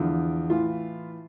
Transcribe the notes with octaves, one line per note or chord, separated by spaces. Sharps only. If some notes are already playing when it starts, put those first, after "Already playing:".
Already playing: E2 D3 F3
A2 E3 F4